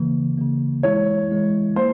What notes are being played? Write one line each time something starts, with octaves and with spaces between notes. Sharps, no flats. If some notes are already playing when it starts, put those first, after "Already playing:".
Already playing: C#3 E3 A#3
C#3 E3 A#3
E3 G#3 E4 C#5
E3 G#3 E4
A#3 C5